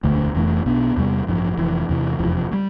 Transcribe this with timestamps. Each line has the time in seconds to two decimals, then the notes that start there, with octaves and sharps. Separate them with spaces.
0.03 E1 D2 D3 A3
0.35 F1 F2 E3 A3
0.66 B1 B2 B3 D4
0.97 E2 C3 G3
1.27 A1 G2 F3
1.57 F1 F2 E3
1.89 E2 C3 E3
2.19 F1 E2 C3 F3
2.51 A2 G3